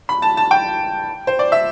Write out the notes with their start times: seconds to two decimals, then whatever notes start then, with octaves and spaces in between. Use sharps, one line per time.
0.09 B5
0.22 A5
0.37 A5
0.51 G5
1.27 C5
1.39 D5
1.52 E5